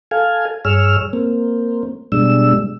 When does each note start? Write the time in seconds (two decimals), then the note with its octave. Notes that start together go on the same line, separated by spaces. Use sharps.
0.11 A4 F5 G#5
0.65 G2 G#4 C#5 E6 F6
1.13 A#3 C4
2.12 B2 G3 G#3 D4 E6